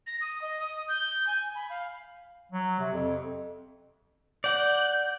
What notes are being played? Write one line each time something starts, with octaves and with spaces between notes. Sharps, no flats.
A#6
D#6
D#5
D#6
G6
G#5
B5
F5
F#3
C3
F2
D5 F#5 G6